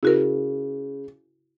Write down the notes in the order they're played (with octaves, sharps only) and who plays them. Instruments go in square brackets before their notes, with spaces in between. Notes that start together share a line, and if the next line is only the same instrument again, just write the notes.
[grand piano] C#3 [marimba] E4 F#4 A#4